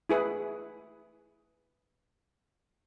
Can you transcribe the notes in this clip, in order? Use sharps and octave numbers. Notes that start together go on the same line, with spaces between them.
E4 G#4 B4